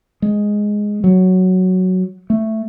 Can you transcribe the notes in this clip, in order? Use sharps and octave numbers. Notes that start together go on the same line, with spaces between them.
G#3
F#3
A3